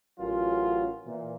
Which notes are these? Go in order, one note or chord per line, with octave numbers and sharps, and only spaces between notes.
A1 F#3 C#4 F4 A#4
A#2 E3